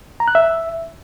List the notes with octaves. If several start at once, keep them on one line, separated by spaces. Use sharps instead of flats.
A#5
F#6
E5